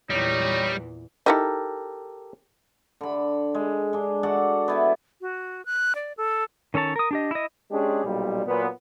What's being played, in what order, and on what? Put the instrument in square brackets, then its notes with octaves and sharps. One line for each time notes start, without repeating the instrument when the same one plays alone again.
[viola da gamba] E2 A#2 E3 [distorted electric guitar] G3 [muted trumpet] D#4 [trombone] C#5
[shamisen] D#4 E4 D#5 [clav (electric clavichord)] G4 A4 A#4
[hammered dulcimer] D3 B5
G#3
G#3 D4
F#4 A4 D5 F#5
B3 E4 B4
[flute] F#4
F#6
D5
A4
[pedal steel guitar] D#3 C#4 A4 C#5 A5
A#4 D#6
D4 G4 D#5
E4 D#5
[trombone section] G#3 C#4 D4 G4 G#4
B1 A#2 G3
A#2 F#3 B3